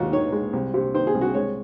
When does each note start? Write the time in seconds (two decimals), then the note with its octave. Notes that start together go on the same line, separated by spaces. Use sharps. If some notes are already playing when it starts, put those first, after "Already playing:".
Already playing: D#2 G#3 F4 F#4
0.12 D#3 C#5
0.32 G#3
0.53 C2
0.74 C3
0.94 D#3 C5
1.07 G#4
1.15 C2
1.21 F#4
1.34 G#3 C#5